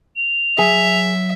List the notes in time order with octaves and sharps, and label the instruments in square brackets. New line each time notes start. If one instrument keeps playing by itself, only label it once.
[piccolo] F7
[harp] F#3 [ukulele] G#4 G#5 [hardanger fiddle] E5